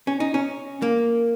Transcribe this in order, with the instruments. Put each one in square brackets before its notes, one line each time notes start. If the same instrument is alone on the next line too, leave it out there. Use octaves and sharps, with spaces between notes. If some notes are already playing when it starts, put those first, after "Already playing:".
[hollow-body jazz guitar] C#4
D#4
C#4
A#3